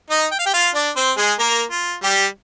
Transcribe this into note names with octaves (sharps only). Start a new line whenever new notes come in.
D#4 D#5
G5
F5
G4 G5
F4 F5
D4 D5
C4 C5
G#3 G#4
A#3 A#4
F4
G3 G4